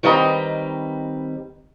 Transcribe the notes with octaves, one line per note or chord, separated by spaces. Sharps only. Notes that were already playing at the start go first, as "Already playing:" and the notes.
D#3 G3 C4 B4 D#5 A#5